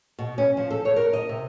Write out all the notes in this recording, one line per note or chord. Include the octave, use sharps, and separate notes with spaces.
B2
C#4
F3
A4
C#5
A#4
D#5
C3